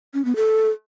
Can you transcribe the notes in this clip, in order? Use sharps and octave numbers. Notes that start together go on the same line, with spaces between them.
C#4
B3
A4